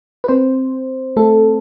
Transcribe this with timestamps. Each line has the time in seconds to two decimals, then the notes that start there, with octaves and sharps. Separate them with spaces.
0.24 B4
0.28 C4 C5
1.17 A3 A4